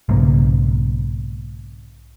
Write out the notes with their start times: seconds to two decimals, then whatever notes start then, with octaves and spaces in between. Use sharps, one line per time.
0.09 B1 G#2 C#3 A#3